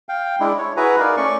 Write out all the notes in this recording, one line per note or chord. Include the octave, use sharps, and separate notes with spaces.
F5 G5
G#3 D4 E4
C#5
E4 F#4 G#4 B4 G#5 A#5
D#4 A#4 D5 F5
A3 C#4 D5 C#6